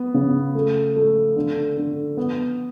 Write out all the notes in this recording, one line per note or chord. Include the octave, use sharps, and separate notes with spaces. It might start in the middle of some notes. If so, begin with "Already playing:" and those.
Already playing: B3
C#3
A3
A3
D3
D3
B3